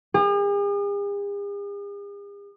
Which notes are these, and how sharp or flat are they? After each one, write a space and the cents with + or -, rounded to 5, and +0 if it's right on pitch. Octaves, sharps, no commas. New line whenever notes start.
G#4 -45